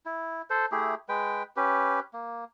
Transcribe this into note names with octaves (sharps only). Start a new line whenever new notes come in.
E4
A4 C5
A3 E4 G4 G#4
G#3 B4 G5
C#4 G4 B4
A#3